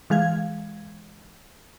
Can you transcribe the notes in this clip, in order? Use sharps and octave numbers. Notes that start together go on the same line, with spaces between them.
E3 G#3 F5 G#6